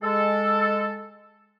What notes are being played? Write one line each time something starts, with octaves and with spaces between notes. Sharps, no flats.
G#3 A4